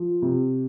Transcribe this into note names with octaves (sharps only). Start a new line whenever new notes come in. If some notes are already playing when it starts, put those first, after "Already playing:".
Already playing: F3
C3